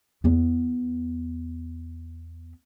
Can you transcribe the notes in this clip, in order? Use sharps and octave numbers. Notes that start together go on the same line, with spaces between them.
E2 B3